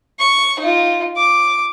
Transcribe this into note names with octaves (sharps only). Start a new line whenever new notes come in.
C#6
D#4 F4
D6